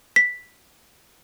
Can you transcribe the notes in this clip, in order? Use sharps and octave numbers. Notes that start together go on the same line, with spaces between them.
B6